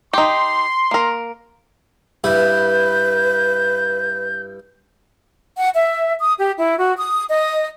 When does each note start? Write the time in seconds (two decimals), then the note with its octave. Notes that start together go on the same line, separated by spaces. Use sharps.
0.13 D#4 G4 C6
0.91 A#3 A#4
2.24 G2 E4 B4 G6
5.58 F#5
5.75 E5
6.20 D#6
6.38 G4
6.57 E4
6.78 F#4
6.97 D#6
7.30 D#5